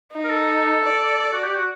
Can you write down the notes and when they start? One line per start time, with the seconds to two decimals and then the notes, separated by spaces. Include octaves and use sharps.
0.12 D#4
0.25 A#4
0.29 A4
0.84 D5
1.19 A4
1.33 F#4
1.44 G4
1.55 F#4